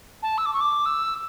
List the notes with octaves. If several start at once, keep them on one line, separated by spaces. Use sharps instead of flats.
A5
E6
D6
C#6
D6
E6